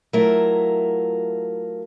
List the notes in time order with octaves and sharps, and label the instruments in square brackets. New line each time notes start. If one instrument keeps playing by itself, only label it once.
[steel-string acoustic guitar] F#3 A3 E4 F4 A#4